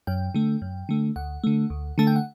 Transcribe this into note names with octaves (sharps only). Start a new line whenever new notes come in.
F#2 G5
D3 A3
F#2
D3 A3
D2 F#5
D3 A3
D2
D3 A3 A5
G5
F#5